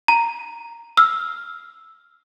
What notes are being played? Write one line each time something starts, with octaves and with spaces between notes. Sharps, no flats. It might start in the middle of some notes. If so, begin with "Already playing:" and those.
A#5
E6 F6